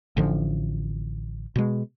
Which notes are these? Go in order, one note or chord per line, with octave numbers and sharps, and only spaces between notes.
A1 D3 F3
B2 G#3